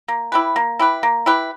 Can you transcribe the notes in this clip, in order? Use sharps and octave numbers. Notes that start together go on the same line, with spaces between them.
A#3
E4 G4 B4
A#3
E4 G4 B4
A#3
E4 G4 B4